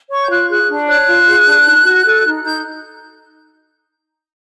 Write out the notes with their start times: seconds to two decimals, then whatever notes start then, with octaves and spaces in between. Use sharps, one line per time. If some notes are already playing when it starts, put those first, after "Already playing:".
0.10 C#5 C#6
0.22 G6
0.29 F4 F#6
0.49 G#4 F#6
0.69 D4
0.88 C#5 F#6
1.07 F4
1.27 G#4
1.46 D4
1.66 D#4
1.85 F#4
2.05 A4
2.24 D#4
2.44 D#4 G6